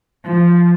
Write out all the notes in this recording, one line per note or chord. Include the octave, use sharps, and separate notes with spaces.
F3